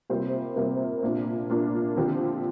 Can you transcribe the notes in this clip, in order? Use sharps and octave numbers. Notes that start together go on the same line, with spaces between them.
C3 G3 A#3 F4 C5
C3 G3 A#3 F4 C5
A#2 A#3 D4 F4
A#2 A#3 D4 F4
D3 F3 C4 G4